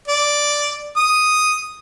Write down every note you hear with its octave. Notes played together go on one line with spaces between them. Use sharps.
D5
D#6